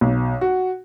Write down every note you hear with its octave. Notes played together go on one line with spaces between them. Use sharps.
B1
F#4